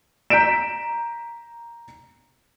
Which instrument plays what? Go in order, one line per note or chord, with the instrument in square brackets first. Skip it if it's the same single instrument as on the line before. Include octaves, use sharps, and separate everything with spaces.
[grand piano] A#5 G6 B6 D7 E7